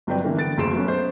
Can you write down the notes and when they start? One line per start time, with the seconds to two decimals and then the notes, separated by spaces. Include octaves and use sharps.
0.07 G1 F#3 C4 B4 D5 G5
0.24 D3 E3 A#3
0.36 D3 B3 A6 D7
0.57 F#1 D2 G#4 C6 D7 E7
0.74 F#3 A3 B3 C#4
0.88 B3 C5